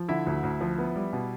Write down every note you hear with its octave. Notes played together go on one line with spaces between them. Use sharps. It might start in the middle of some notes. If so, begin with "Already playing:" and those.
Already playing: F3
D3 E4 E5
D2
D2
F3
B3
G3
B2